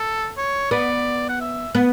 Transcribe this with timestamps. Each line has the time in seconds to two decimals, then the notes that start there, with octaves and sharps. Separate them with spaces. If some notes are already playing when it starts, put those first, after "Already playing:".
Already playing: A4
0.37 C#5
0.71 B3 D5
1.29 F#5
1.41 E5
1.75 B3